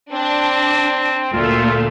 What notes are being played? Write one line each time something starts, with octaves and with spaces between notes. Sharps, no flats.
C4 D4
D2 A#2 A3 F4